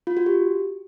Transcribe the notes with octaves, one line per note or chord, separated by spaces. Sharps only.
F4
F#4
G4